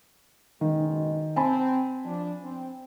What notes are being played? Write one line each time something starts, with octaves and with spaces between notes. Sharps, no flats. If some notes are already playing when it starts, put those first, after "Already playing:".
F#1 B2 D#3 G#3
C4 G#5 A5 B5
F3 D4
C4